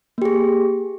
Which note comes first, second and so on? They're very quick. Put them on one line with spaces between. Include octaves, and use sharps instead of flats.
A#3 G4 G#4